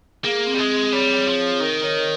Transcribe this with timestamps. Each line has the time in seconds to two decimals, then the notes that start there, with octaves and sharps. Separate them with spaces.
0.24 A#3 G#4
0.47 C4
0.54 G3
0.58 G#3
0.71 G#4
0.92 G3 C#5
1.15 C#5
1.27 F3
1.38 C#5
1.60 D#3 A#4
1.83 C#5